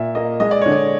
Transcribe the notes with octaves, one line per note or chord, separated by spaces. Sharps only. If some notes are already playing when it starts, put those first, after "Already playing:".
Already playing: A#2 E5
A#3 D#5
G#3 D#5
D5
D3 C#5
D5